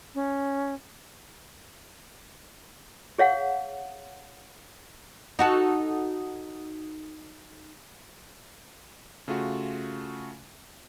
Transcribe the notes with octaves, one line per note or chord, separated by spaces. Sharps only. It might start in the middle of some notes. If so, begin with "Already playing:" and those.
C#4
G#4 C#5 F5 F#5
D#4 F#4 A4
C#3 A3 F4 F#4